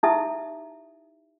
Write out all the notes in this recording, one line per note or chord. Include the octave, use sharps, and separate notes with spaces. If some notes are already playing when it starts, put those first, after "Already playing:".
D#4 E4 G4 E5 A5 D#6